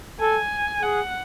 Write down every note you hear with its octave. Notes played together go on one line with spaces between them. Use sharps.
A4 G#5
G#4 F#5